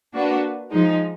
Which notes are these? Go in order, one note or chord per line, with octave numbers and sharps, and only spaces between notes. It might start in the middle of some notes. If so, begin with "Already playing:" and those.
A#3 D4 F#4 B4
F3 G#3 D#4